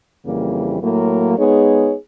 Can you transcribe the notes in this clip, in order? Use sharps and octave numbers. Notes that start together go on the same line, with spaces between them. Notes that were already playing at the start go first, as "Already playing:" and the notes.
F2 C#3 E3 G3 A#3
A2 F#3 A#3
G#3 B3 D#4 G#4 C#5